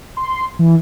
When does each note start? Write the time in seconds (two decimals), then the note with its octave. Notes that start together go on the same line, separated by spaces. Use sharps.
0.17 C6
0.59 E3